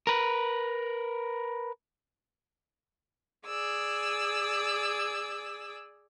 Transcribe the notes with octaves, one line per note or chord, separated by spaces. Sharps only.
A#4 B4
G#4 D5 E6